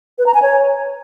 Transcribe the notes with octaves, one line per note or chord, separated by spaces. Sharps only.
B4
A#5
G#5
C#5